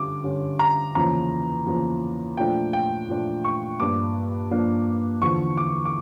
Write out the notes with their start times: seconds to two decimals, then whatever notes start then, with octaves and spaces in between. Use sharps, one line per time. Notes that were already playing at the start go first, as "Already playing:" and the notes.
Already playing: D3 G3 C#4 D6
0.24 D3 G3 C#4
0.59 A#5
0.95 E2 C#3 F3 A#3 A#5
1.66 E2 C#3 F3 A#3
2.37 A#2 F3 A3 D4 G5
2.73 G5
3.09 A#2 F3 A3 D4
3.44 C#6
3.80 G2 F3 A#3 D4 D6
4.51 G2 F3 A#3 D4
5.22 E2 D3 F3 C#6
5.57 D6
5.85 D6